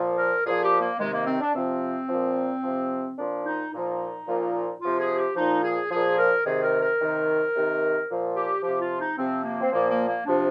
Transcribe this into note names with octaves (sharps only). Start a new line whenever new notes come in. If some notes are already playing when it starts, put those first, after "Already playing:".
Already playing: A#2 F3
A#4
A#2 F3 G#4
G4
A#3
C3 D#3 G#3
A#3
C4
D4
C3 F3 C4
A#2 F3
C3 F3
A#2 F3 D4
D#4
A#2 F3 D#4
A#2 F3
C3 F3 F4
G#4
G4
A#2 F3 D#4
G#4
A#2 F3 G#4
A#4
C3 D#3 G#4
A#4
A#4
C3 D#3
C3 D#3
A#2 F3
G4
C3 F3 G4
F4
D#4
C3 F3 C4
A#3
C4
A#2 F3 A#3
A#3
A#3
C3 F3 D4